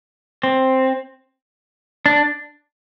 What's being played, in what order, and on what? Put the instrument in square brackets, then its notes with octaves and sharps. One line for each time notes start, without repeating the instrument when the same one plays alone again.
[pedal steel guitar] C4
D4